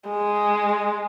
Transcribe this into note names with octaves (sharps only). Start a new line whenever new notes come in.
G#3